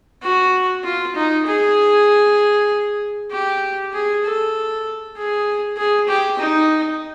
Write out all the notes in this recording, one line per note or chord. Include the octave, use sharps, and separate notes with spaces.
F#4
F4
D#4
G#4
G4
G#4
A4
G#4
G#4
G4
D#4